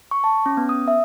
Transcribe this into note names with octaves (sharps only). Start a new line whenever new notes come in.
C#6
A5
C#4
B3
D#6
E5